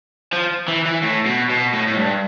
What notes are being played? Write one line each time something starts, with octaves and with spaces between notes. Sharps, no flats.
F3
E3
E3
A2
B2
B2
A2
A2
G2